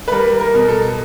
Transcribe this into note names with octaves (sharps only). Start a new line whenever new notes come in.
B4
G3 A#4
A#4
B2
A4